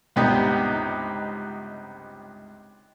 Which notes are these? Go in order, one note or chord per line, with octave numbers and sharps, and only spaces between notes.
C#2 G2 C3 B3 D#4 G4